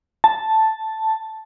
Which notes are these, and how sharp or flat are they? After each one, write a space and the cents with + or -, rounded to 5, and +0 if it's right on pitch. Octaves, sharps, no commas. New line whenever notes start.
A5 +0